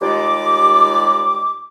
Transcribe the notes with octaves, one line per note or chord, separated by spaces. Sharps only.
D#2 G3 G#3 F4 D5 D6